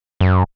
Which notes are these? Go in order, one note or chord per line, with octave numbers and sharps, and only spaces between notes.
F#2